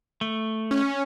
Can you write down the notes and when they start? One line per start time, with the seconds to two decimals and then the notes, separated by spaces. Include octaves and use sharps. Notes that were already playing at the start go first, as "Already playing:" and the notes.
0.21 A3
0.71 C#4